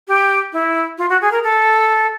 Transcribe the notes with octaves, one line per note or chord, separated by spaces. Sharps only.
G4
E4
F4
F#4
G#4
A#4
A4